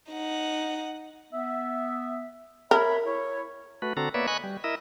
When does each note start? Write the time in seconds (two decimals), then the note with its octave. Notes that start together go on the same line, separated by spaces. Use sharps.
0.11 D#4 F#5
1.32 B3 E5
2.71 A#4 C#5 E5 B5
3.06 E4 C#5
3.82 A3 F#4 B4
3.97 D3 C4 F#4 A4 A#5
4.14 A#3 B3 B4 C#5 D5 E5
4.28 D#5 G#5 B5 C#6 F#6
4.44 G3
4.64 E4 A#4 D#5 E5